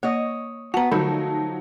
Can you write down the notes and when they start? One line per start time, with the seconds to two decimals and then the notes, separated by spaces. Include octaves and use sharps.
0.03 A#3 C#5 D#5
0.74 B3 F#4 A5 A#5
0.91 D3 F3 F#3 A3 D#4 A4